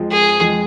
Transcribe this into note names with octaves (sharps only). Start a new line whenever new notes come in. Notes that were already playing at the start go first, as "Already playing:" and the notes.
Already playing: F2 F3 G#3
G#4
F2 F3 G#3